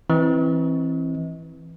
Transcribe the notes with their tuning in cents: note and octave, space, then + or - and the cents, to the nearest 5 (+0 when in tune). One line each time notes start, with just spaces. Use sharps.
E3 +0 C4 +20 D#5 +30